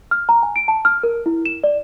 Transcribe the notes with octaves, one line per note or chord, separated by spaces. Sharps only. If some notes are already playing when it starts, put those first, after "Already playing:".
F6
A#5
G#5
D7
A5
F6
A#4
E4
E7
D5